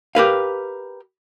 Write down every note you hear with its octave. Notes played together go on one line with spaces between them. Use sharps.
G4 A#4 B4 F5